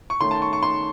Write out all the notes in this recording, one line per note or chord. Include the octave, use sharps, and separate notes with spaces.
C#6
D#3 A3 C#4 C6
A5
C#6
C#6
C6